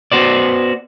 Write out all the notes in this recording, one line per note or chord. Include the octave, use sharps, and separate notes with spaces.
B3 F#4 C5 D5